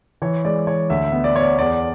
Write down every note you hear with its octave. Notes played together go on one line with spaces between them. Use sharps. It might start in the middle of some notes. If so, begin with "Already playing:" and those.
E3 C#5
G#3 D5
E3 C#5
D2 E5
E5
B3
D5
B3 C#5
D5
E2 D5